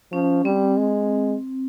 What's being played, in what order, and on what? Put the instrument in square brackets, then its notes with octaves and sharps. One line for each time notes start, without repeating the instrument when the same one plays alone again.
[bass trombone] F3 [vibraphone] C#4
[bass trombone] G3 [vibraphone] C4
[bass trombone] G#3